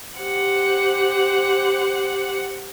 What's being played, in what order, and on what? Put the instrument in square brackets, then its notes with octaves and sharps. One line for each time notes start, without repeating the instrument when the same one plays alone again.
[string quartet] G4 C5 F#5